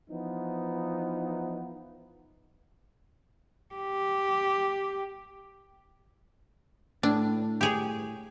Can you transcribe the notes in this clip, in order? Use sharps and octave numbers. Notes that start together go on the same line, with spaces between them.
E3 F3 B3 D#4
G4
A2 D4
G4 G#4 C#5